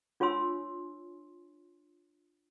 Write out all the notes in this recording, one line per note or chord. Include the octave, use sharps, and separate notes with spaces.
D4 F4 C#5 G#5 C6 E6